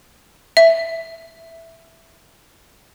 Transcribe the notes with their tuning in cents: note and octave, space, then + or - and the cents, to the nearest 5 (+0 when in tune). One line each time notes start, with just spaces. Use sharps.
E5 +0